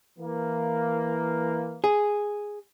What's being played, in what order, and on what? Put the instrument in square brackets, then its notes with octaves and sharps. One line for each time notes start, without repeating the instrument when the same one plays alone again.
[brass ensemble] E3 A#3
[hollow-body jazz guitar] G#4